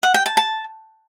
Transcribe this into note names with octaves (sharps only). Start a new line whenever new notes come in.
F#5
G5
A5
A5